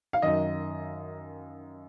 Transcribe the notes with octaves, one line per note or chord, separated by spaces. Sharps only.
F5
F#2 D#3 D#5